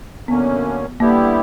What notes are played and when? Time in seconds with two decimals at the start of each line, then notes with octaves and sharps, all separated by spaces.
0.28 F#2 D3 A#3 B3 C#4
1.00 D3 G3 A#3 B3 E4 G4